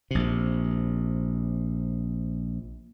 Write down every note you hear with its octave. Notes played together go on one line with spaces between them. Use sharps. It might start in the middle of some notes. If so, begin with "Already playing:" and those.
A#1 C3